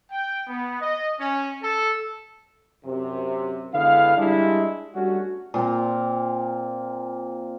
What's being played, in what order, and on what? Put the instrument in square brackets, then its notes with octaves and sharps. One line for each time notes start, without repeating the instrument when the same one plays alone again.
[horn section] G5
B3
D#5
C#4
A4
[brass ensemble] F#2 C3
D3 G#3 B3 E4 F5
G3 G#3 D4 E4
G3 A3 C#4 D4 F#4
[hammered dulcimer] A#2 C4 F4 A#5